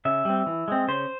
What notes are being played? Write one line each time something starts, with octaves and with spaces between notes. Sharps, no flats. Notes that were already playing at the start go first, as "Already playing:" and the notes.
C#3 E5
G3 C4
E3
G#3 C4
C#3 C5